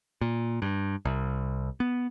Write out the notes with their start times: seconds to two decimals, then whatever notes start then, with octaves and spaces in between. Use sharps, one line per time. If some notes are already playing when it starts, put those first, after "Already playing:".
0.21 A#2
0.62 G2
1.05 C2
1.80 B3